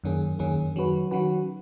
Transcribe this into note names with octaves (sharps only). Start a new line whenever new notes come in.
F#2 D#3 A#3 C#4 G#4
F#2 D#3 A#3 C#4 G#4
D#3 F#3 C#4 F#4 B4
D#3 F#3 C#4 F#4 B4